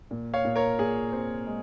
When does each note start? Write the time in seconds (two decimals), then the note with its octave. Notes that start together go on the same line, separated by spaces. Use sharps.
0.11 A#2
0.34 C#5 F5
0.45 A#2
0.56 A#4 C#5
0.79 A#2 G#4
1.12 C4
1.47 G#3